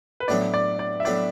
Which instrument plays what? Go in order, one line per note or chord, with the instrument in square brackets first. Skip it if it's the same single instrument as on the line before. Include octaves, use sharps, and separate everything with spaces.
[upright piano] B4
[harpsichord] A1 A2 F#3 B3 D4 [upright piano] D5
[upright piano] D5
D5
E5
[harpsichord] A2 F#3 B3 D4 [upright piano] D5